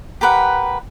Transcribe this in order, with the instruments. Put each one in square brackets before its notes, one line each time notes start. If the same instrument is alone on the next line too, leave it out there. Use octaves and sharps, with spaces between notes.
[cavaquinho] G4 A#4 B4 F#5